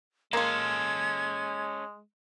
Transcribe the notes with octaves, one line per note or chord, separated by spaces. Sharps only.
G#3 A#3 C#4 F4 A4 G#6